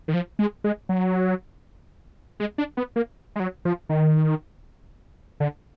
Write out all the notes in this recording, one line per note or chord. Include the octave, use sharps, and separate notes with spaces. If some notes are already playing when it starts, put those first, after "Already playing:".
D#3
F3
G#3
G#3
F#3
G#3
D4
B3
A#3
G#3
F#3
F3
D#3
D3